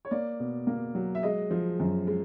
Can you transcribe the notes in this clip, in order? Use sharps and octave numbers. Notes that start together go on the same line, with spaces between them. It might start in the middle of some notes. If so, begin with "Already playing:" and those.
C#5
A#3 D5
B2
A#3
F#3
E5
G#3 D#5
F3
F#2
G#3